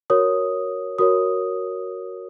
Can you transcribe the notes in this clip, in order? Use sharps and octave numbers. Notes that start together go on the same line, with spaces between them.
F#4 A#4 C#5 D#6
F#4 A#4 C#5 D#6